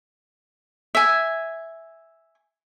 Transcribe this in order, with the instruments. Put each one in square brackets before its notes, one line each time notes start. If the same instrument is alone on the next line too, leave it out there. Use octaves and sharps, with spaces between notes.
[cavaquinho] E5 G#5